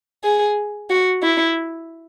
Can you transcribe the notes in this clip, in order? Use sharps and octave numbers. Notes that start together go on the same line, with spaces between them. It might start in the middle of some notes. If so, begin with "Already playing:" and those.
G#4
F#4
E4